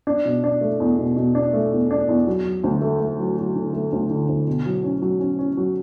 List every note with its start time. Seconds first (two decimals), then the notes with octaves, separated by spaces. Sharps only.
0.07 D4
0.25 B2
0.44 D4
0.61 A3
0.80 E2
0.98 B2
1.16 B2
1.35 D4
1.53 A3
1.72 E2
1.91 D4
2.08 E2
2.27 F#3
2.45 F#3
2.64 D2
2.81 A3
3.00 A3
3.19 F#3
3.37 F#3
3.55 D3
3.73 A3
3.92 D2
4.10 D3
4.28 D2
4.47 B2
4.66 F#3
4.84 C#4
5.02 F#3
5.20 C#4
5.39 C#4
5.57 F#3